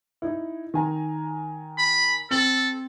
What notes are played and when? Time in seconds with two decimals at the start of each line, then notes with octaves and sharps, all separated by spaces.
0.22 D#4 E4
0.74 D#3 G#5 A#5
1.78 B5
2.31 C4 A4 F#7